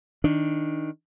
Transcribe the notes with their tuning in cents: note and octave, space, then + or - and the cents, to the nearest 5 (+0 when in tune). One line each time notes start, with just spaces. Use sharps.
D#3 +10 D4 +0